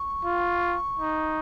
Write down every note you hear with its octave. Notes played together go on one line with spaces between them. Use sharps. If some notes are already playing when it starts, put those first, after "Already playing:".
Already playing: C#6
F4
D#4